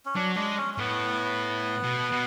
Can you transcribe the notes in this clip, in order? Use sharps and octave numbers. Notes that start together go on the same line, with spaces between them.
C#4
F#3 D4
G#3 D4
C#4
C#4
A2 B3
B2
B2